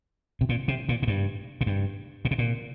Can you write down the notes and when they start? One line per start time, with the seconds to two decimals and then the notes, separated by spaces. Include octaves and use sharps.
0.41 C3
0.49 A#2
0.68 C3
0.89 A#2
1.02 A#2
1.07 G2
1.61 A#2
1.66 G2
2.25 A#2
2.31 C3
2.38 A#2